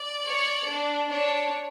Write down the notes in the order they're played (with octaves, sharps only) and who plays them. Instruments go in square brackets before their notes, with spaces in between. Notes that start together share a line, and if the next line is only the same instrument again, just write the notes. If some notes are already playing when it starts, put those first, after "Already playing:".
Already playing: [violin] D5
[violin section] C#5
D4
[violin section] D4 [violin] C#5